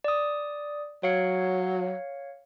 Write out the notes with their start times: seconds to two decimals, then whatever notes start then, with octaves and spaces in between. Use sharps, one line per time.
0.04 D5 D#6
1.03 F#3 C#5 F5 C#7